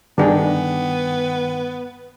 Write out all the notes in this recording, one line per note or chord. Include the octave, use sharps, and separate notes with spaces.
G2 D3 D#3 B3 D4 G#4 G5